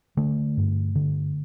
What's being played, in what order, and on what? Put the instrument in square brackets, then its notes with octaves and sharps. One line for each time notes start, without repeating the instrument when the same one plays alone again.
[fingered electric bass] D3 A3
G2
D3